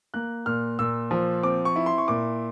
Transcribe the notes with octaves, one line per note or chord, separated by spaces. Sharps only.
A#3 F#6
A#2 F6
A#2 E6
F3
C4 D6
C#6
E4
C6
C#6
A#2 D6